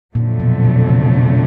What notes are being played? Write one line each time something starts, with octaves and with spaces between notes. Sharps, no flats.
F2 A#2 D3 F#3 A3
B2
B2
C#3
B2